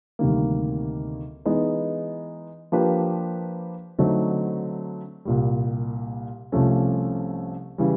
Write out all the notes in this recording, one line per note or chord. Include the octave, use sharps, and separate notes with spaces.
D2 C3 D#3 G3 A#3
E3 G#3 B3 D#4
F3 A#3 D4 G4 B4
D3 F#3 A3 C4 D#4
C2 A#2 G3
C2 C3 F3 A3 C#4
C#3 E3 G3